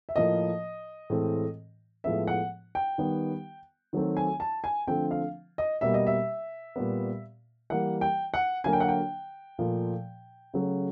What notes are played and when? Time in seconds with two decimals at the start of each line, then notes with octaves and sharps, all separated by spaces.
0.09 E5
0.16 A2 F3 A#3 D#5
1.10 A2 E3 G#3 C4
2.04 A2 F3 G#3 B3 E5
2.27 F#5
2.75 G5
2.98 D#3 G3 B3
3.93 D#3 F#3 A3 C4
4.17 G#5
4.40 A5
4.64 G#5
4.87 D3 F3 A3 C4 G5
5.11 F5
5.58 D#5
5.81 B2 G3 A#3 E5
5.94 D#5
6.07 E5
6.76 A#2 G3 B3
7.70 E3 G3 A#3 F#5
8.01 G5
8.34 F#5
8.64 D3 F#3 A#3 G#5
8.73 G5
8.80 F#5
8.88 G5
9.58 A#2 F3 A3
10.54 C#3 F#3 A3